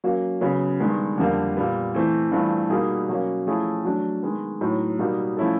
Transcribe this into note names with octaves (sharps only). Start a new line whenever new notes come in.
F#3 A#3 C#4 F#4
C#3 F#3 B3
G2 D#3 G#3 B3
F2 D3 G3 A#3
A#2 G3 B3
E3 A3 C4
G2 E3 A3 C4 F4
B2 G3 A#3 D#4 G#4
B2 F#3 A#3 C#4
F3 A3 C#4 E4 G#4
F#3 A3 D4
D#3 G#3 B3
A2 F#3 B3 D#4
B2 G3 A#3 D#4
F3 A3 C#4 E4 A4